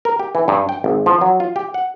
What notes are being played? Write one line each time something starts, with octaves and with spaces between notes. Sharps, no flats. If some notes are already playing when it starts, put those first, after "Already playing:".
A#4
G4
E3
G2
G5
G#1
F3
F#3
F4
G4
F#5